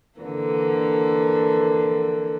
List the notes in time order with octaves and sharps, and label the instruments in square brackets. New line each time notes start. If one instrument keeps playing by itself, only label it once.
[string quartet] D3 E3 A#3